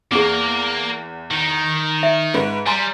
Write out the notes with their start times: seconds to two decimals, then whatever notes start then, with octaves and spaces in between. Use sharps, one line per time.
0.11 E2 A#3 G#4 D6
1.31 D#3
2.03 E5
2.34 G#2 B4
2.66 G3 G#5 A#5 C6